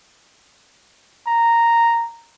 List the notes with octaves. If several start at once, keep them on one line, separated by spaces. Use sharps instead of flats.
A#5